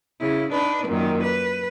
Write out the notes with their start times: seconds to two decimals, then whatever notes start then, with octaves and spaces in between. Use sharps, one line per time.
0.20 C#3 E4
0.51 D4 D#4 B4
0.86 F#2 A#2 D#3
1.22 B4